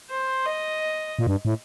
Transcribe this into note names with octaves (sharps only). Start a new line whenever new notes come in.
C5
D#5
A#2
G2
A2